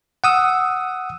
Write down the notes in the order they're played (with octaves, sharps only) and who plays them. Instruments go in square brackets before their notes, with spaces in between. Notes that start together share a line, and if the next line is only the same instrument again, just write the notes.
[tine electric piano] F#5 D#6 E6